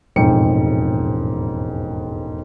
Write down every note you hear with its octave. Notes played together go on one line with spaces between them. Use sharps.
E1 A1 F2 G#2 G5 C#7